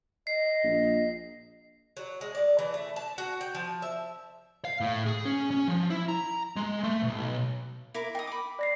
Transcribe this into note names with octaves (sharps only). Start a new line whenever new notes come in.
D#5 C7
A#1
F#3
G#3
D5
E3
A3
A5
F#4
G5
F3
E5
F5
A2
G#4
C#4
C#4
F3
E4
A#5
G#3
A3
B1
E4 A#4 D6
D#4 G5 D#6
B5 D6
D5 A#6 C7